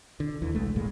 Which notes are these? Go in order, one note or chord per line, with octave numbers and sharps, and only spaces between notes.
D3
D#2 E3
B1 G#3 A3
C#2 G2 A#2 G#3